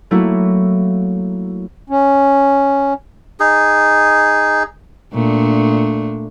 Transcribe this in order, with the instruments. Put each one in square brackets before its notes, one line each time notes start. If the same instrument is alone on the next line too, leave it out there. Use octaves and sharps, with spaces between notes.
[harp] F#3 A3 A#3 E4 F#4
[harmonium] C#4
[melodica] D#4 G#4
[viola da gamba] A#2 A3 D4